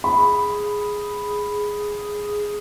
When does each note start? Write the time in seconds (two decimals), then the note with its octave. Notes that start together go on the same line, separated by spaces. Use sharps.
0.04 G#4 B5